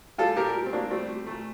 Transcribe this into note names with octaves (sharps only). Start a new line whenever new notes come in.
G3 F4 A4
A#2 G4 A#4
G3
C4
G3 A#3 D4
G3 A3 C4
G3
A#2 A3